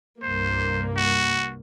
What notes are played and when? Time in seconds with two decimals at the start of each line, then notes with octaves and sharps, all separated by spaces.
0.22 C2 G2 A#3 C5
0.96 F#4